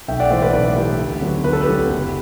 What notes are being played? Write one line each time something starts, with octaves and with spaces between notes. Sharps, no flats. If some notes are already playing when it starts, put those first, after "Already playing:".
B1 E5 G5
D5 F#5
A2 E3 C5 E5
B4 D5
B1 B4 D5
A2 E3 G4 B4
D2
D3 F#3 B3
D2 B4
A4
G4 B4
D3 F#3 B3
F#1